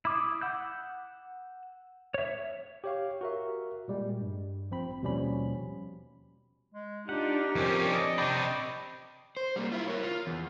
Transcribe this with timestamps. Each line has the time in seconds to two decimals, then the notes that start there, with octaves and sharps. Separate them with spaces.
0.05 E4 D6 D#6
0.41 F#5 E6 G6
2.14 C#5 E5
2.84 G4 C#5 F5
3.21 F#4 A#4 E5
3.88 A#2 G3 G#3
4.21 G2
4.70 A1 F3 C4 B5
5.02 D#2 B2 F3 G3 C#4 B5
6.74 G#3
7.09 D4 D#4 F4 G4 F#5
7.55 F2 F3 C4 C#4 A#4
7.86 D5 D#5
8.18 C3 D4 G5 B5 C#6 D6
9.37 C5
9.56 G3 A#3
9.72 E4 F4
9.88 A#4 C#5
10.03 F4
10.27 E2